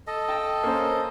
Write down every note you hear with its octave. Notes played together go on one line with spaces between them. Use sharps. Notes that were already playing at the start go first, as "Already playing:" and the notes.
A4 D#5
G5 A5
A#3 C#4 C5